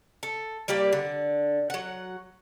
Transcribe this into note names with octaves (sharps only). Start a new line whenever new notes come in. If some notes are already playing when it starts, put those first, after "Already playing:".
A4
G3 A#3 G4 D5
D3
F#3 F#5